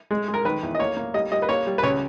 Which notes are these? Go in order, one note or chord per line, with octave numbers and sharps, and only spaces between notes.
G#3
G#3
A#4
D#3 B4
E2
D#5
A#3 C#5
A#3
G3 D#5
G3 D#5
B4
A#3 C#5
G3
B4
C#2 C#5